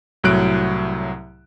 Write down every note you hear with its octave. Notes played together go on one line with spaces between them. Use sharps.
C2 A2 F#3 F#6 D7